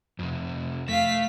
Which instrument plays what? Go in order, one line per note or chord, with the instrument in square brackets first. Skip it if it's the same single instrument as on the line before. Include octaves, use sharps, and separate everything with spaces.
[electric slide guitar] F2 C3
[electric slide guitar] A3 [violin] F5 B6